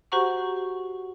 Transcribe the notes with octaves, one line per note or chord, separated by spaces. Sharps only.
F#4 G4 C5 F#5 A#5 C#6